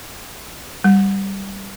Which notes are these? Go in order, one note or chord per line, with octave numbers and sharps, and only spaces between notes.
G3